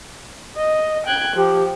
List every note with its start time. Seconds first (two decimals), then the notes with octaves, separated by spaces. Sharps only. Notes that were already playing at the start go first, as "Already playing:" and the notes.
0.56 D#5
1.06 G5 F#6 G#6
1.36 F3 G4